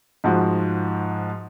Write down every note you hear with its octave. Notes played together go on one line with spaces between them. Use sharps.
G#2 F3 F#4